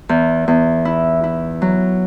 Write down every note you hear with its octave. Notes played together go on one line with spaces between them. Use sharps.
E2
E2
E4
E4
F#3